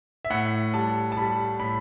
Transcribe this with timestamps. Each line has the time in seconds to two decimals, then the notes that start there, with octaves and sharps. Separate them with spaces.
0.25 E5
0.30 A2 F#5
0.74 G3 A5
1.12 A5
1.17 G3 B5
1.59 A2 B5